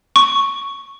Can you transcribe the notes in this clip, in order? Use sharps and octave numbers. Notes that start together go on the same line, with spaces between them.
C#6